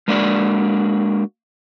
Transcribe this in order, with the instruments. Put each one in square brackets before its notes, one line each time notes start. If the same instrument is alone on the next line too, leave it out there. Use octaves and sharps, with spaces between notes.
[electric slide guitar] G#3 A#3 D4 F#4 D5